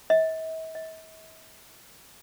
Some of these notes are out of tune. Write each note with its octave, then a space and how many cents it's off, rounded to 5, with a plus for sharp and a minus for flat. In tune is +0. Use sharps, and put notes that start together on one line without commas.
E5 -45
E5 -45